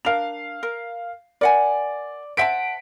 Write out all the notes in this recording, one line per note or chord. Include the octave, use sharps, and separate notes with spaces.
D4 A#4 F5 F7
A#4
A#4 D5 F#5 G#5
C5 E5 F#5 A5 B6 D7